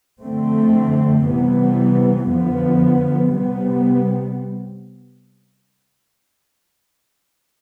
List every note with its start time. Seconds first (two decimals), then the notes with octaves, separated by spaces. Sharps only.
0.21 F2 D3 A3 C4
1.24 C3 E3 G3 B3
2.27 F2 D3 F3 B3
3.30 C3 G3 B3